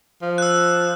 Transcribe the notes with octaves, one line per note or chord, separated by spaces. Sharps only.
F3
E6 F#6